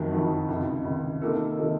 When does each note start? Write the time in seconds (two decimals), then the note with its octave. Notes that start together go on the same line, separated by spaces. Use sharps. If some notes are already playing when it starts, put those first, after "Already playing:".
Already playing: F#1 F2 D#3 F#3
0.12 F#1 F2 D#3 F#3
0.48 C#2 C3 D#3
0.85 C#2 C3 D#3
1.22 C3 D#3 A#3 D#4 A4
1.58 C3 D#3 A#3 D#4 A4